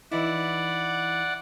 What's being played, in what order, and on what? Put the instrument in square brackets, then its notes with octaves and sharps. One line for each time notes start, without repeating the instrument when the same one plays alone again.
[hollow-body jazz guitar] E3 D#4 E4 [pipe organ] D5 F#5